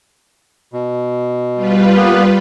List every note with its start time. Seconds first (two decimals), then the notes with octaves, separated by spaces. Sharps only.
0.73 B2
1.54 G3 F4 B4
1.97 A#3 B3